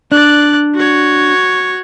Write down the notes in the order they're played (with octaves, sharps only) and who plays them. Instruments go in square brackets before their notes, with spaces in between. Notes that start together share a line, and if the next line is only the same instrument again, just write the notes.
[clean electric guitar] D4 [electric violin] D5 F#6
[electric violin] F#4 C#5